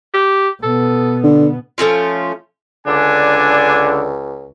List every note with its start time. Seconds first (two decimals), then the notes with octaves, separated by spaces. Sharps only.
0.14 G4
0.63 B2 B3 A4
1.24 D3
1.78 F3 A3 C#4 F4
2.87 C#2 D3 D4 G#5